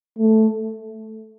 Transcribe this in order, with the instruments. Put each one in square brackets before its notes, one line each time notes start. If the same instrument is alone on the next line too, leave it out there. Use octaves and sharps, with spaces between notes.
[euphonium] A3